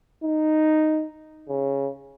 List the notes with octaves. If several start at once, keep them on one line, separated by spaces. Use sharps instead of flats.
D#4
C#3